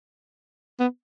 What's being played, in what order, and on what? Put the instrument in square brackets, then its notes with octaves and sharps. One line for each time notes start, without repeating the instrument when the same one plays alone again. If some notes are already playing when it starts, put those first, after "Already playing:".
[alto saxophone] B3